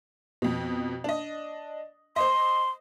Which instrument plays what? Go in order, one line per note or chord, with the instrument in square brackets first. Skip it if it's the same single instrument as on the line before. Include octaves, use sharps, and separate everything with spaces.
[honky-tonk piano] F2 B2
D4 D#5
[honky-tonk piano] C5 D#5 [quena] C6